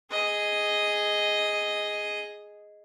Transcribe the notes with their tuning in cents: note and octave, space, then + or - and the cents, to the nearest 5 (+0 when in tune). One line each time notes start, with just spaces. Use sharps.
G#4 +0 D#5 +0